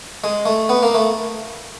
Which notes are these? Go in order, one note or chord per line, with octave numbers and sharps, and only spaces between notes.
G#3
A3
B3
A#3
A3